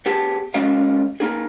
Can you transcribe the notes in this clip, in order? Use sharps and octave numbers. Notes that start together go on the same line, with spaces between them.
B3 G4 G#4 A5
D#2 G#3 C#4 F#4 D#5 F5
A#3 D#4 G#4